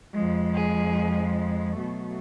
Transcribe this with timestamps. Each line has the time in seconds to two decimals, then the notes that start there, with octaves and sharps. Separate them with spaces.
0.13 F2 F3 G#3
0.53 G#4
1.78 B2 F#3 A3